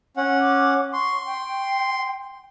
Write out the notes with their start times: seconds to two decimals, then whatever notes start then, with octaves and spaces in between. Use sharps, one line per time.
0.17 C#4 F#5
0.40 D6
0.93 C6 C#6
1.26 G5